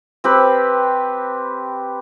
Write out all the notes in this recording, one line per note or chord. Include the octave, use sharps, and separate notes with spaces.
C4 G4 B4